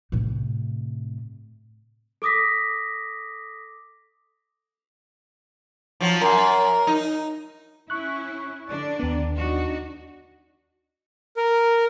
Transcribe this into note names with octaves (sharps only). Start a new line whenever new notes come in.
A2 C3
A4 D6 D#6 A#6 B6
F3 F#3
F#2 A#4
D#4
C#4 E4 C#6 F#6
D3 D4 D5
D#2 B3
D4 D#4 F#4
A#4